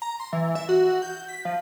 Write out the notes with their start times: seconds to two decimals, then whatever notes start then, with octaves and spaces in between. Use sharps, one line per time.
0.02 A#5
0.20 C6
0.33 E3
0.55 E5
0.69 F#4
1.02 G6
1.28 B6
1.45 F3